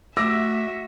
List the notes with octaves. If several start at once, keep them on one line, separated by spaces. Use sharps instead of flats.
A3 F#4 E5 D6 E6 A#6